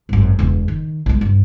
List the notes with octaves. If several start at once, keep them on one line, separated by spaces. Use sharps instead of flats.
G#1 F#2
E1 E2
D#3
B1 G#3
G2